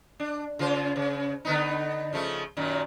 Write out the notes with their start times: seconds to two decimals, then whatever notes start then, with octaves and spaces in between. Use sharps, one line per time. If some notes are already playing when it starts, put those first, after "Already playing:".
0.20 D4
0.59 C#3 F4 C5
0.96 C#3
1.45 D3 B3 D#4
2.13 C#3 F3 A3
2.57 F#2 A#2 D#3